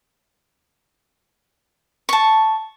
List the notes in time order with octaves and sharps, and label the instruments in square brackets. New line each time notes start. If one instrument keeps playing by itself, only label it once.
[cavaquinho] A5 C#6